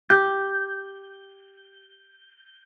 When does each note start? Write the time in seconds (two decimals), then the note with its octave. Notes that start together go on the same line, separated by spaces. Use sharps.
0.10 G4 G6